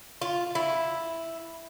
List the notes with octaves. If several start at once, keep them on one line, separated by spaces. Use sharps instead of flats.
F4
E4